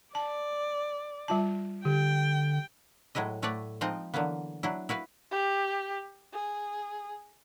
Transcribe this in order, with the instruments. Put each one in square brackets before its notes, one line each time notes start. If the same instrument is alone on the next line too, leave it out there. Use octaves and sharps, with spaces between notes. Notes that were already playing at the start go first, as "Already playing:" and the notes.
[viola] D5 [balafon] A5
[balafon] G3 F4 A5
[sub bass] D3 [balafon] G4 [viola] G5
[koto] A2 F#3 G#3 E4 D#5
A2 A3 B4 C#5 D5 F#5
F3 G#3 C4 D#4 F4 D#5
D3 E3 F#3 A#3 B3
F#3 D4 E4
E4 F#4 B4 F5
[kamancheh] G4
G#4